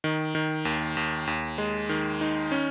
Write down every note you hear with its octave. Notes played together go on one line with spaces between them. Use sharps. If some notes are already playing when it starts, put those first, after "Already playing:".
D#3
D#3
D#2
D#2
D#2
G#3
D#3
D#4
C#4